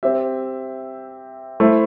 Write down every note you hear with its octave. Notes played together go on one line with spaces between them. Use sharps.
C4 G4 E5
A3 E4 C5 E5